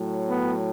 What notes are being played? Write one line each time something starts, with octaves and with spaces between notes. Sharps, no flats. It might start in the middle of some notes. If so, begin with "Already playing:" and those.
Already playing: A2 F#3
B3